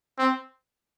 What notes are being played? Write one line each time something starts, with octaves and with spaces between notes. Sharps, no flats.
C4